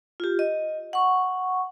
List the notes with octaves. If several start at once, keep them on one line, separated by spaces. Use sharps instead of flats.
F4 G4
D#5
F#5 C#6